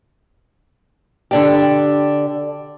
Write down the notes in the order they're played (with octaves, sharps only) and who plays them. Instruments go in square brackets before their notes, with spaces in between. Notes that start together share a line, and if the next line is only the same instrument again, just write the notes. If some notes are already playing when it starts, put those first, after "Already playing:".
[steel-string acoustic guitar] D3 D4 G4